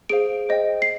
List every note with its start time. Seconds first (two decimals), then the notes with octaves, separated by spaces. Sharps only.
0.09 G#4 C5 F5 D7
0.49 C5 D#5 G5
0.82 C7